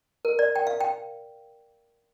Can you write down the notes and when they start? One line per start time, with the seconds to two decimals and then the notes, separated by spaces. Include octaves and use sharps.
0.25 A#4
0.39 D5
0.56 G5
0.67 F5
0.80 G5